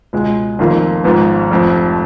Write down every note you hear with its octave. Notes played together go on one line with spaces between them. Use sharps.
C#2 B2 G#3
F1 F2 D#3 A#3 F4
G#1 G#2 F3 B3
F1 F2 F3